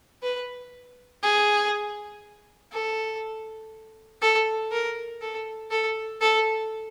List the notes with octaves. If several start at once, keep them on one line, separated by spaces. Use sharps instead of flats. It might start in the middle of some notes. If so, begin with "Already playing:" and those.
B4
G#4
A4
A4
A#4
A4
A4
A4